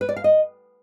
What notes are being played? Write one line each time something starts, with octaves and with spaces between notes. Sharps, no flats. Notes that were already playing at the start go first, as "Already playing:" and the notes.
B4
D5
F5
D#5